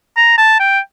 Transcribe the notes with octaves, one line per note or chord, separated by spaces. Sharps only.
A#5
A5
G5